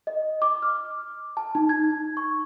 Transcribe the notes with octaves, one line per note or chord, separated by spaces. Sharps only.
D#5
D6
F6
A5
D#4
G#6
C#6